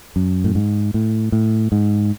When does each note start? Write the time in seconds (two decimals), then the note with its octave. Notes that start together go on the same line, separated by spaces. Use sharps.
0.16 F#2
0.44 A2
0.55 G#2
0.94 A2
1.32 A2
1.72 G#2